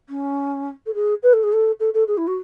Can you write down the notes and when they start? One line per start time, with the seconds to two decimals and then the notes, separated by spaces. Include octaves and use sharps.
0.09 C#4
0.86 A4
0.94 G#4
1.23 B4
1.33 A4
1.43 G#4
1.52 A4
1.80 A4
1.94 A4
2.07 G#4
2.17 E4
2.27 F#4